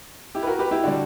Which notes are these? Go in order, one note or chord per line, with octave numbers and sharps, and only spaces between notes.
E4 G4
B4
F#4 A#4
G4 B4
E4 G4
D3 G3 D4 F#4